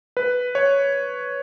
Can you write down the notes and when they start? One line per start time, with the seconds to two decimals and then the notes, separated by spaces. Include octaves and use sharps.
0.17 B4
0.55 C#5